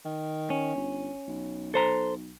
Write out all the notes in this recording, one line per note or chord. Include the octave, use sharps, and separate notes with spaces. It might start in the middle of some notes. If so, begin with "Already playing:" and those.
D#3
C#4
G1
B1
A4 C5 A#5